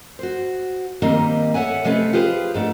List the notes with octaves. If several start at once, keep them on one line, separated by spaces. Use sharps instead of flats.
F#4 C5
D#3 G3 A#3 C4 D#4
A4 C#5 E5 F#5 G#5
C3 G#3 A3 C#4 A4 B4
F4 G4 G#4 B4 C5
G#2 A3 D4